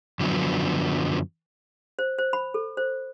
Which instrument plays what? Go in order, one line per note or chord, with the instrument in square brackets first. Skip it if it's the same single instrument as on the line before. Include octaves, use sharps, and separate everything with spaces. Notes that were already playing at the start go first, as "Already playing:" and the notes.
[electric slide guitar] F#2 D3 F3 F#3 B3
[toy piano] C5
C5
B5
A4
C5